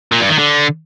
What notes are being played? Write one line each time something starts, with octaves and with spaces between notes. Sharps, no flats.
A#2
G2
D#3
D3